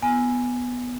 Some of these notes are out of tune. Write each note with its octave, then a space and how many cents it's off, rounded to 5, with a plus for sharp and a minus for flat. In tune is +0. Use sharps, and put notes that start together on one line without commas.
B3 +0 G#5 +0